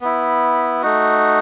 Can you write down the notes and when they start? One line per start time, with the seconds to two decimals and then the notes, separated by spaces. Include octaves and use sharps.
0.01 B3 E4
0.82 A3 D#4 F#4